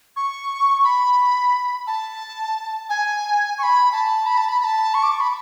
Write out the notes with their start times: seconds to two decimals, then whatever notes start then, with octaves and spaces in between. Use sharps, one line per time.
0.16 C#6
0.84 B5
1.87 A5
2.90 G#5
3.58 C#6
3.63 B5
3.93 A5
4.26 B5
4.38 A5
4.49 B5
4.61 B5
4.64 A5
4.94 C#6
5.03 D6
5.12 C#6
5.20 B5